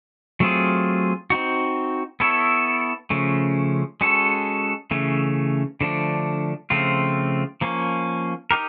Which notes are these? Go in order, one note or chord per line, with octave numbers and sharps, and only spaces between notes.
F#3 A3 C4 F4 G#4
C4 D#4 F#4
B3 E4 A4 C#5
C#3 F3 A3 C#4
G#3 C#4 F#4 A4
C#3 E3 A3 C#4
D3 F3 A3 D4
C#3 F3 A3 C4 F4
F3 A#3 C#4
D#4 G4 A#4